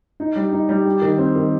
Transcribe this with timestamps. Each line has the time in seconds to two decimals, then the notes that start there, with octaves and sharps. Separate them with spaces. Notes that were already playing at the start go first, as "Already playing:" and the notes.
0.20 D#4
0.36 G3
0.52 D#4
0.69 G3
0.86 G4
1.02 D#3
1.18 C4
1.36 D#3